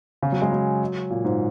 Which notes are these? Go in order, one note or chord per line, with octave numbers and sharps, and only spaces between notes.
C#3
F#3
G#3
F#3
A#2
G#2